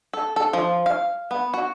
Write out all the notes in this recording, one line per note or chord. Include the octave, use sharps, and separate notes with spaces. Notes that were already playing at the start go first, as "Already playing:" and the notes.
A4
A4
F3
F5
B3
F#4